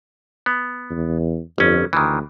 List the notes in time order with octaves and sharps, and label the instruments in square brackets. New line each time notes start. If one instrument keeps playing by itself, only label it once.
[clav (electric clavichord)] B3
[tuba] E2
[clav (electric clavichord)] G1 C#4 [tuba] F2
[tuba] D2 [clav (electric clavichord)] D#3 E3